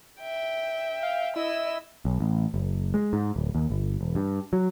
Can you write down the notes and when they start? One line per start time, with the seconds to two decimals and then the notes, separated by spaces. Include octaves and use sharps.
0.21 E5 G5
1.03 F5
1.36 E4 D#5 E6
2.05 B1
2.20 A1
2.54 F#1
2.94 G#3
3.13 G#2
3.36 D1
3.55 D#2
3.70 G1
4.01 E1
4.15 G2
4.53 F#3